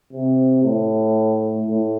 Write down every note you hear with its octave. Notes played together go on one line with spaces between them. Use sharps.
C3
A2
A2